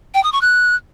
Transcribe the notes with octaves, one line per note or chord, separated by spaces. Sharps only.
G5
D#6
C#6
F#6